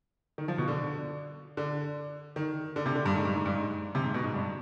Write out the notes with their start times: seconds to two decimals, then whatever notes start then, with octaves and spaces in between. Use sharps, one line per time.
0.38 D#3
0.48 F3
0.58 B2
0.68 D3
1.57 D3
2.36 D#3
2.76 D3
2.86 C3
2.95 D3
3.06 G2
3.15 G#2
3.25 G2
3.35 G#2
3.46 G2
3.55 G#2
3.95 C3
4.04 G#2
4.14 B2
4.24 G#2
4.34 G2